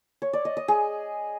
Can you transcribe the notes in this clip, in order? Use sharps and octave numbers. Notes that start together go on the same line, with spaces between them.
C#5
D5
D#5
D#5
G#4